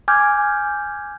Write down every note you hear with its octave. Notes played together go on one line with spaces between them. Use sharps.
G#5 D6 F6 G6 G#6